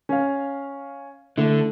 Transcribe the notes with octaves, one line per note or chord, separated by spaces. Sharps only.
C#4 F5
D3 A3 E4